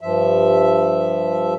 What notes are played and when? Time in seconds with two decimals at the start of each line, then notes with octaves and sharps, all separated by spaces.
0.01 G2 F3 E5